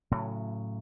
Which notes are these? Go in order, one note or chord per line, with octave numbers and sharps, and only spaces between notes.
A2 C#3 F#3